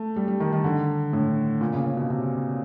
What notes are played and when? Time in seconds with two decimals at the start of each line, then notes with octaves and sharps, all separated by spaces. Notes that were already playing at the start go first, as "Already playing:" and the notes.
Already playing: A3
0.16 G3
0.28 G3
0.40 D#3
0.53 D#3
0.64 D3
1.13 A2
1.61 A#2
1.73 C#3
1.86 C#3
1.97 B2
2.10 C3